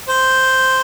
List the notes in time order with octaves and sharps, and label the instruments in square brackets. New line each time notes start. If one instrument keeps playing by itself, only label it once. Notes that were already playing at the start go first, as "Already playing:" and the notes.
[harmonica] C5